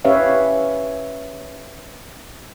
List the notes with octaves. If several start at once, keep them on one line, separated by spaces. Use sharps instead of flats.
C#4 G4 B4 C#5 E5 F5